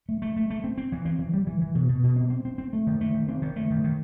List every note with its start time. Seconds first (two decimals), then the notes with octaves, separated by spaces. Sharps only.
0.09 A3
0.22 A3
0.36 A3
0.50 A3
0.64 C4
0.78 C4
0.92 E3
1.05 C4
1.19 E3
1.34 G3
1.47 E3
1.62 E3
1.75 B2
1.89 B2
2.03 B2
2.16 C4
2.30 C4
2.45 C4
2.58 C4
2.73 A3
2.87 D#3
3.01 A3
3.14 D#3
3.28 C4
3.42 D#3
3.56 A3
3.70 D#3
3.84 D#3